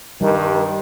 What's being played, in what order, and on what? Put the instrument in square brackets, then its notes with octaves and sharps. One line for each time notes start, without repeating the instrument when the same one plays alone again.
[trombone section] G2 D#3 [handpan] G3